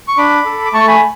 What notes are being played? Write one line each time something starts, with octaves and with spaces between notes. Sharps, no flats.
C#6
D4 B5 D6
A4
D6
A3 A5 C#6
G#5 B5